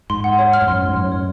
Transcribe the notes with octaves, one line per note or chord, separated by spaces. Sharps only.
G#2 C6
F#5
C#5
F6
G#2
F#2 C6
C#5
G#2
F#2 C#5
C#5